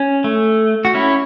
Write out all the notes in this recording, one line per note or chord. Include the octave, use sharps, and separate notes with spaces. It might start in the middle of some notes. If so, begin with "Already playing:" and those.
Already playing: C#4
A3
F#4
C#4 E4